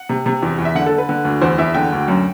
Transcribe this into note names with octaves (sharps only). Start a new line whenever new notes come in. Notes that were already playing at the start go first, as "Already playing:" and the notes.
Already playing: F#5
C3
C3
E2
E2
E5
D3 F#5
A4
D3
B4
D3
D2
E2 C5
E2 E5
D3 G5
D2
F#2